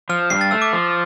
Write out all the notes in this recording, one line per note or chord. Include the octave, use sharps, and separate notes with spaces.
F3 F6
G2 C7
A6
A3 E6
D6
F3